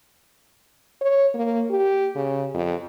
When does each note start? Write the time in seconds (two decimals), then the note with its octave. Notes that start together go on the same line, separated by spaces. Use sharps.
1.01 C#5
1.34 A#3
1.70 G4
2.15 C#3
2.54 F2